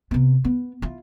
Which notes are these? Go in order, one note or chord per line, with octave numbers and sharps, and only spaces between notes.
C3 B3
B3
E4 F4